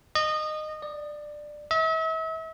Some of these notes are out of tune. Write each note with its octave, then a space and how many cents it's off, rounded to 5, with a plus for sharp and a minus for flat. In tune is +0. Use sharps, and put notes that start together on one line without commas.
D#5 -20
D5 +15
E5 -40